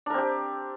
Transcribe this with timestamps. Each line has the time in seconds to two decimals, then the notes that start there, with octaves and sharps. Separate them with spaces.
0.06 D4
0.10 A#4
0.14 C4
0.18 G4